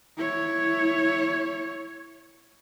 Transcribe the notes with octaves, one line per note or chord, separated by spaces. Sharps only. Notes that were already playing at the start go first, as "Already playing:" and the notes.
E4 C#5